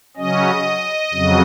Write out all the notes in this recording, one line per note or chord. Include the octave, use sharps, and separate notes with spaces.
C#3 F#3 C#4 D#5
F2 C#3 F#3